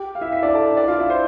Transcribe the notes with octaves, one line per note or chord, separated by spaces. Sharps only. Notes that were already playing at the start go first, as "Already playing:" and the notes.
Already playing: G4
F5
E4 E5
E4 E5
D4 D5
A4 A5
D4 D5
F4 F5
E4 E5
C5